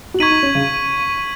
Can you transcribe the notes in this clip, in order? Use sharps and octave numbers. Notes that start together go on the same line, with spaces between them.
F#4
D#4 C#6 G#6 B6 D#7 F#7
D#4
C#4
C#3